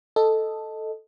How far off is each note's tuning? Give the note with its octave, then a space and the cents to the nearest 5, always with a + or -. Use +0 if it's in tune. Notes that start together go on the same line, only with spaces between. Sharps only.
A4 +0 D#5 +0